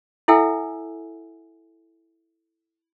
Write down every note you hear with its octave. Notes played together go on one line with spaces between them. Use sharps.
E4 A4 E5 F#5 G#5 E6